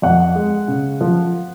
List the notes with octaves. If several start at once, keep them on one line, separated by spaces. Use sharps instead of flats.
F2 F#5
G#3
C#3
F3